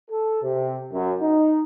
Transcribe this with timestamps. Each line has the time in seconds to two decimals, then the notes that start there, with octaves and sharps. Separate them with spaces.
0.11 A4
0.43 C3
0.92 F#2
1.22 D#4